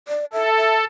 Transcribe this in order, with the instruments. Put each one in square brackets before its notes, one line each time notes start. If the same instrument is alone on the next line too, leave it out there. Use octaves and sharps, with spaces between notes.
[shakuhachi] D5
[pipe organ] A4 [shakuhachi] E5
[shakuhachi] E5